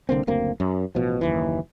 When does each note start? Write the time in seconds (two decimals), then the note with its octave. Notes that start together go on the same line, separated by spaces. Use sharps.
0.09 C2 D3 A#3 C4
0.27 F#1 D2 A#3 C4
0.60 F#2
0.95 A1 B2 F3
1.21 F#1 D#2 E3